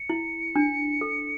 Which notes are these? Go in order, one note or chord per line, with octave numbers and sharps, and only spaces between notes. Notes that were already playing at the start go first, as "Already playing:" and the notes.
Already playing: C#7
E4
D4
A4